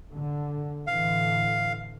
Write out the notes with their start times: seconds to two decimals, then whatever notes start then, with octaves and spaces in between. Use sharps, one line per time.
0.13 D3
0.87 A2 D3 E3 F5